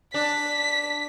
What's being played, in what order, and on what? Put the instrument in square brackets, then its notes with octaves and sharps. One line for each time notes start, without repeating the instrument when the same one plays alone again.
[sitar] D4 [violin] B6